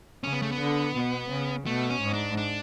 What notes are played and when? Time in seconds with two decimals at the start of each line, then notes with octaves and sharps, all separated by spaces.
0.23 C#3 C#4
0.33 B3
0.42 A3
0.52 B3
0.59 D3
0.94 B2
1.30 C#3
1.66 B2 A3
1.90 C#4
2.01 G#2
2.14 D4
2.37 D4